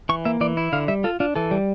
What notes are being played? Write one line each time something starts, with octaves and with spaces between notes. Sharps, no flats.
E3 C#6
A#3 E5
E3 D5
E4
D3 F5
G3 E5
F4 A4
D4 F4
E3 A4
G3